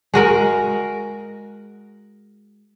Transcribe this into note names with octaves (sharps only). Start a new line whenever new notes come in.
G#3 F#4 A#4